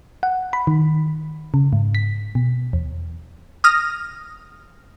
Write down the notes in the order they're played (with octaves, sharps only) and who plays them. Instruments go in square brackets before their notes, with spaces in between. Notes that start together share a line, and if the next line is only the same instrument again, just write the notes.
[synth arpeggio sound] F#5
B5
D#3
C#3
G#2
B6
B2
E2
[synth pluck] D#6 F6 A#6